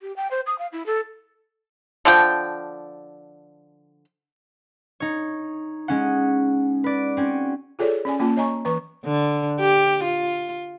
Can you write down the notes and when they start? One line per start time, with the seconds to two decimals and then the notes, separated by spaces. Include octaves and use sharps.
0.02 G4
0.16 G5
0.31 C5
0.46 D#6
0.59 F5
0.72 E4
0.86 A4
2.05 D3 F3 G5
5.00 D#4 C#5
5.88 G#3 C#4 F#5
6.84 B4 D5
7.17 C4 C#4 F#4
7.79 F4 G#4 A4 C#5 D5
8.05 C#4 D5 G#5
8.20 A#3 C#4 F4 A5
8.37 C#5 D#5 G#5 A#5 C#6
8.65 E3 B4 A#5 C#6
9.05 D3
9.60 G4
10.04 F4